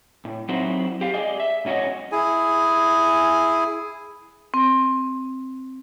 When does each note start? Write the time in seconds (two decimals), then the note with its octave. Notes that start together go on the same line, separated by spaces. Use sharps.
0.25 A2
0.48 F#3 C4 D#4 E4 F#4 C5
1.01 G4 F5
1.14 G#4 D5 D#5
1.40 E5
1.65 G#2 C#4 F#4 C#5 D#5
2.12 E4 G#4 G#5
4.54 C4